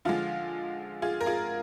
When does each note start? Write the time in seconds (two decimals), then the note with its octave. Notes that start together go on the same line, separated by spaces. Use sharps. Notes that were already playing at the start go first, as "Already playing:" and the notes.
0.05 D3 F3 G#3 F4
1.02 F4 G#4
1.21 A#4
1.26 F4 G#4